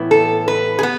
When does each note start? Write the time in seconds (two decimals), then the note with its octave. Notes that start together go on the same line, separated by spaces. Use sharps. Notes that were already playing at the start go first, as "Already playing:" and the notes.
Already playing: A2 E3 B3
0.11 A4
0.48 B4
0.79 G#4
0.83 B3